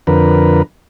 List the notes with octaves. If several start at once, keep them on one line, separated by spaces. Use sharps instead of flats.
F2 D3 A#4 B4